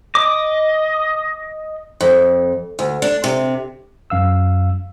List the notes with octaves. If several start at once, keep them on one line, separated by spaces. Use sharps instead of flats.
D#5 D6
F2
D2
D4
C3
F#2 F5 E6